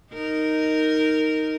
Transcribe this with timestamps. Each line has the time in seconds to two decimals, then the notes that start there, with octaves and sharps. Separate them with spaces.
0.13 D#4 A#4